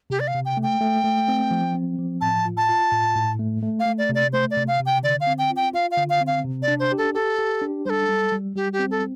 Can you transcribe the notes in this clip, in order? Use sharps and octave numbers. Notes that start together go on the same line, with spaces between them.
C3 G4
D5
F5
C3
G5
A3
G5
A3
A3
C4
F3
C4
F3
A2 A5
F4
A5
F4
A2
A2
A3
A3
F5
A3
D5
C3
D5
A3 C5
D5
C3
F5
C3
G5
D3 D5
F5
C4
G5
F4
G5
F4 F5
F5
D3
F5
C4
F5
C3
D5
D4
C5
G4
A4
G4 A4
G4
D4
G3 A4 C5
G3
G3
G3 G4
G4
C4
A4